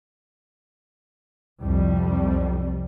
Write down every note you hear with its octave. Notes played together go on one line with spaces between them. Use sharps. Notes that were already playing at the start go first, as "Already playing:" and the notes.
C2 F2 G3